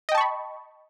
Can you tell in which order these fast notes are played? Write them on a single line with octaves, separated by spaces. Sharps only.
D#5 G5 A5 C#6 B5